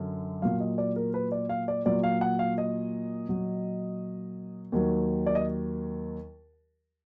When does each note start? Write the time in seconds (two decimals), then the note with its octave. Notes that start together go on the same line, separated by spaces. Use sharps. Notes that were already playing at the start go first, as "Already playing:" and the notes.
Already playing: F#2 D3
0.42 A#2 F#3 F5
0.60 D#5
0.78 D5
0.96 A#4
1.14 B4
1.32 D5
1.49 F5
1.68 D5
1.86 A#2 F#3 D5
2.04 F5
2.21 F#5
2.39 F5
2.58 D#5
3.29 A#2 F#3
4.72 D#2 D#3 F#3
5.27 D5
5.35 D#5